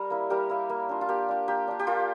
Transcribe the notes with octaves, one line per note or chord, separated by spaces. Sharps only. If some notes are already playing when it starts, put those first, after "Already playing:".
Already playing: G3 A#4
A#3 E4
G3 G4 A#4
A#3 E4
A#3
D4 F4
F4
A#3 G4
D4 F4
A#3 G4
D4 F4
G4
A#3 F4